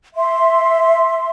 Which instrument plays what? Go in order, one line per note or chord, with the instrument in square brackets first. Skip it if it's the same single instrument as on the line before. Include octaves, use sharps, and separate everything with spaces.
[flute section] E5 C6